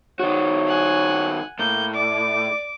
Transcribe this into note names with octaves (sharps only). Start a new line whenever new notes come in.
D#3 F#4 C#5
F#5 G#5
A2 A#3 G6
D5 D6